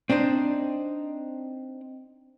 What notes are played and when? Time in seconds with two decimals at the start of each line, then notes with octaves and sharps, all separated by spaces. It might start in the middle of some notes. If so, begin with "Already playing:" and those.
0.10 C4 D4 D#4 C5